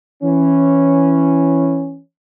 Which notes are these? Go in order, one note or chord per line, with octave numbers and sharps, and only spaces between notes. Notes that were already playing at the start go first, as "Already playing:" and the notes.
E3 C#4